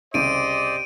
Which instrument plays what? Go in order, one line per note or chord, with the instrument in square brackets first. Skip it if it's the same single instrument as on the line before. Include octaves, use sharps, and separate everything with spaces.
[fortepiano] C2 C#3 [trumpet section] G4 C5 D#5 [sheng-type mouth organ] D5 [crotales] D7 D#7